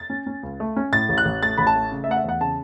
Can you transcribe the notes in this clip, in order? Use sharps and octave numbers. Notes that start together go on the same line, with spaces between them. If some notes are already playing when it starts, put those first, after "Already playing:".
Already playing: A6
C#4
C#4
C#2
A3
C#4
A2 A6
A1
F#6
A1
A3 A6
A1 B5
A5
A3
C#3
E5
A3 F#5
E5
E2 F#5
C#3 A5